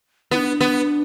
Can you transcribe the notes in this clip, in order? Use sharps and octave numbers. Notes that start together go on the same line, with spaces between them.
B3 E4
D4
B3